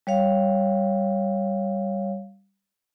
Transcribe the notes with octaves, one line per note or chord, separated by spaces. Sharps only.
G3 C#5 F5